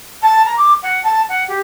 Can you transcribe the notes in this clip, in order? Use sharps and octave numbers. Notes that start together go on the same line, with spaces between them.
A5
A#5
D6
F#5
A5
F#5
G4